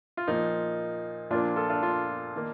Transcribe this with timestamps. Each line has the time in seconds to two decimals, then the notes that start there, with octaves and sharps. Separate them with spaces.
0.17 F4
0.27 A#2 F3 A#3 D#4
1.30 A#2 F3 A#3 D4 F4
1.56 F4 A4
1.69 D4 F4
1.82 D4 F4
2.36 D#3 A#3